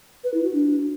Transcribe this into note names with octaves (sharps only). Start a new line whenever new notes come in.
B4
E4
F#4
D4